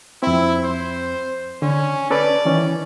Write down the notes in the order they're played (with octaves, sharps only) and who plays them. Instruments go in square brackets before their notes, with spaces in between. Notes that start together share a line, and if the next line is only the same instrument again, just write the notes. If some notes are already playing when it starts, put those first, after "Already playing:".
[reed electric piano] F2 C4 [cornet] E4
[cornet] C5
[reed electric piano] D3 [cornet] C#4
[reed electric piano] C#4 A4 B4 [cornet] D5
[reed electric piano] D#3 E3 C#4